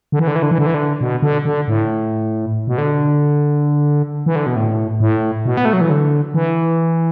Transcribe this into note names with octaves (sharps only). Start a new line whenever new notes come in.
D3
E3
D3
E3
D3
E3
D3
E3
D3
B2
D3
D3
A2
B2
D3
E3
D3
B2
A2
A2
B2
B3
A3
F#3
E3
D3
E3